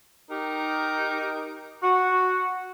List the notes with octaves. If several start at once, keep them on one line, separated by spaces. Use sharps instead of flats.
D#4 G4 A#4
F#4